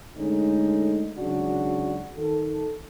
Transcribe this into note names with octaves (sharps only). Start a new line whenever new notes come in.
D3 G#3 A3 C#4 D#4
G#1 C#3 F#3 D4 F#4
D#3 A4